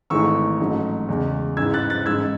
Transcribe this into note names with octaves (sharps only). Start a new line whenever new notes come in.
G#1 G#2 E3 A3 C#6 E6
A1 G#2 F#3 A3
E2 C#3 G#3
A1 G#2 E3 G#3 E6 G#6
F#6 A6
F#6 A6
A1 G#2 G#3 E6 G#6